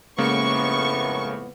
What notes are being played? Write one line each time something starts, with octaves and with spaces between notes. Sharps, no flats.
F2 A2 C#3 G#3 A#3 B3 C#6